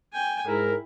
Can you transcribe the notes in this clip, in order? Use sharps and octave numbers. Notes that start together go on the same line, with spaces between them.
G5 G#5
G#2 E4 G#4 A#4